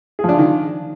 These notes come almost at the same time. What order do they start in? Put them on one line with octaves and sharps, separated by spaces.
G#4 F3 D4 F4 D#3